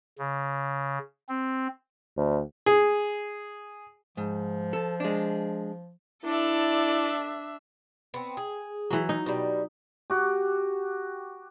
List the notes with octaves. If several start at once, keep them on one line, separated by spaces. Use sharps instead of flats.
C#3
C4
D2
G#4
G#2 F3
A4
G#3 D4
D4 E4 A4 D5 E5
B3 C4
G#4
E3 F#3
D#4
B2 G3
F#4 G4